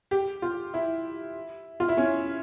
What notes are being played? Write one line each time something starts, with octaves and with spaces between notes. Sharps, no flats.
G4
F4
E4
F4
E4
C#4